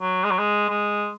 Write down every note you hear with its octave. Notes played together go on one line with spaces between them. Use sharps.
F#3
G#3
F#3
G#3
G#3